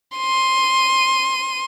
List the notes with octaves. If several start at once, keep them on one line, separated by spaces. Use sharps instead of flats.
C6 D#7